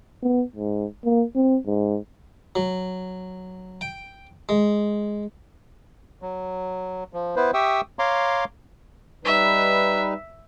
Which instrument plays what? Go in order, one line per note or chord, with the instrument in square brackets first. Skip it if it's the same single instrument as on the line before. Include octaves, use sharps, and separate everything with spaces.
[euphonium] B3
G#2
A#3
C4
G#2
[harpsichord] F#3
G5
G#3
[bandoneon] F#3
F3
B3 E4 B4 C5
G4 E5 G5 C#6 D#6 E6
C#5 F5 A#5 C6 D6
[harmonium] G3 D#4 B4 [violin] E5